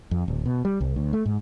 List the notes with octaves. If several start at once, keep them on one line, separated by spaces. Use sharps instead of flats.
F2
D1
B2
G3
C2
D2
A3
G#2